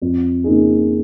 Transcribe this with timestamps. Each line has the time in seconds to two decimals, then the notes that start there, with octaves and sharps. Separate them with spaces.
0.01 F2
0.44 C#3 A#3 D#4 G#4